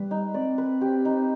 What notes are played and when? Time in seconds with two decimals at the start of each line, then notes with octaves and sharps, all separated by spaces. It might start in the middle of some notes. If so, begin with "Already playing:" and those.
Already playing: G3 B4
0.11 D#4
0.34 C4 D5
0.58 B4
0.81 G4
1.05 D#4